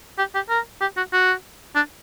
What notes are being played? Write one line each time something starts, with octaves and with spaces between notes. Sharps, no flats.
G4
G4
A#4
G4
F#4
F#4
D4